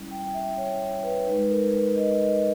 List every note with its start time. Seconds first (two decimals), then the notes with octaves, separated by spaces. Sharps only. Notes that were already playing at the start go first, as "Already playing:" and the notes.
Already playing: G3 C#4 E4
0.11 G5
0.34 E5
0.57 C#5
1.03 B4
1.27 G#3 D#4 B4
1.50 A#4
1.73 B4
1.96 D#5
2.19 D#5